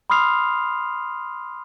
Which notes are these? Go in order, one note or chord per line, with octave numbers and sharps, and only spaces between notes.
B5 C6 D#6 F6 C7 F7